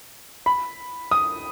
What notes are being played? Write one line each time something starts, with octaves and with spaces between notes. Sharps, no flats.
B5
D#6